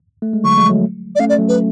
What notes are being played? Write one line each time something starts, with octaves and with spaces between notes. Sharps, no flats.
A3
G#3
D3 F#3 C#6
F3 G#3
F#3 A3
D5
A3 C#4 F5
D5
F#3 A3
B4